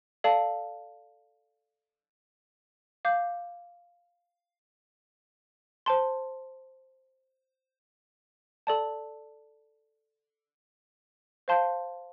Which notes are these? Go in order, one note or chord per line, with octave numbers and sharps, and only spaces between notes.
A4 D5 F5 A5
F5 D6 G6
C5 A5 C6
A4 D5 A5
C5 F5 A5 C6 G6